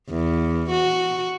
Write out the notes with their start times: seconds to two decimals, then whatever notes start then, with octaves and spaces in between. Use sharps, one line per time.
0.10 E2
0.71 F#4